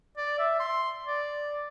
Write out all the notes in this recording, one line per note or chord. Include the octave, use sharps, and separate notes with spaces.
D5
E5
C6
D5